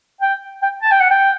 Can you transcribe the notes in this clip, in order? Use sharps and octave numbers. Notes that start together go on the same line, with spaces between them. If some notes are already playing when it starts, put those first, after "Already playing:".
G5
G5
A5
G5
F#5
G5